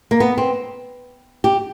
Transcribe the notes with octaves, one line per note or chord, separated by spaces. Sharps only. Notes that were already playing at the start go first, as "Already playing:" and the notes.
A#3
B3
C4
G4